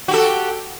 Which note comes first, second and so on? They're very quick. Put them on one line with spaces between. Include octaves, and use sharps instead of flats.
F#4 G4 A4